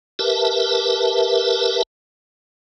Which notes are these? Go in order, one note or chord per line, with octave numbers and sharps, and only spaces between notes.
G4 A#4 B4 E5 A5